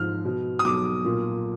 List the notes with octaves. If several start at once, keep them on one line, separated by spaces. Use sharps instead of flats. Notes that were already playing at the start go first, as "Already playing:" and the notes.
Already playing: G#2 F3 F6
B2
D#6
B1 D6
A#2